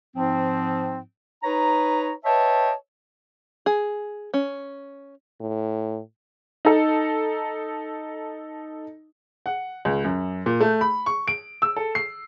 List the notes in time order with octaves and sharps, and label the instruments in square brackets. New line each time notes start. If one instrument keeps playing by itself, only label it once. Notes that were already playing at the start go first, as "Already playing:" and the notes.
[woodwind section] G#2 F3 C4
D#4 B4 C#5 A#5
B4 C#5 D#5 E5 G5 A5
[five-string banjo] G#4
C#4
[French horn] A2
[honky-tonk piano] D#4 A4
[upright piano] F#5
C#2
F#2
A#2
A3
B5
C#6
D7
E6
A4
C7